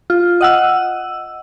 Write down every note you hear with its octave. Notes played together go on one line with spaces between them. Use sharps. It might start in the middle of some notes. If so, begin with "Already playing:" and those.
F4
D#5 F#5 E6